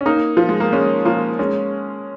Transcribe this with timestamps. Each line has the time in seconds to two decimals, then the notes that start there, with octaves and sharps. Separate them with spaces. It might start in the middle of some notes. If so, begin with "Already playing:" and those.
0.01 C#4
0.06 A#3 D#4
0.37 F3
0.49 G#3
0.60 A#3
0.73 G#3 C#4
1.05 F3 A#3
1.39 G#3 C#4